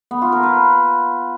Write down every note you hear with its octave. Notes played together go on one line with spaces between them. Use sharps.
B3
F4
A#4
B4